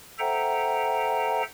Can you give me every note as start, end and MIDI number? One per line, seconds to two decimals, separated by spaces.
0.19 1.43 69
0.19 1.43 72
0.19 1.43 76
0.19 1.43 78
0.19 1.43 79
0.19 1.43 82